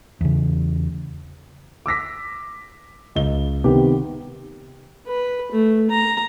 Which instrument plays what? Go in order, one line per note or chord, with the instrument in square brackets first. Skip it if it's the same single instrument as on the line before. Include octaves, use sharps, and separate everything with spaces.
[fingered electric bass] E2 C#3
[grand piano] D6 E6 A#6 B6
C#2 D#5 G7
C3 D#3 B3 G4
[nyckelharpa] B4
A3
A#5